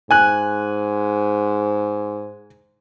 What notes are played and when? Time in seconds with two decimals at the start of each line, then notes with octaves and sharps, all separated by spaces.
0.11 G#2 G#5 F#6